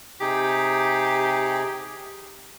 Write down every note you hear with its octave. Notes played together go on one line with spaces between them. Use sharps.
C3 D#4 G4 G#4